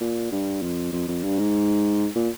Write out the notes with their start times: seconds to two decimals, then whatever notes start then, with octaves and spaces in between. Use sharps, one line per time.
0.01 A#2
0.31 G2
0.62 F2
0.93 F2
1.08 F2
1.24 G2
1.39 G#2
2.15 A#2